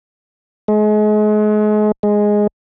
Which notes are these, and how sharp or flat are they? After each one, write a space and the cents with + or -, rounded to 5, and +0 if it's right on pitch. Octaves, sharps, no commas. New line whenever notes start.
G#3 +35
G#3 +0